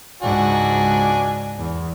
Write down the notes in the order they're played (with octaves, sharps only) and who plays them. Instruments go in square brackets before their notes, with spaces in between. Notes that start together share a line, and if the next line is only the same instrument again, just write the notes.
[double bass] C#2 G#2 [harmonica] D4 F#4 G#5
[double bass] E2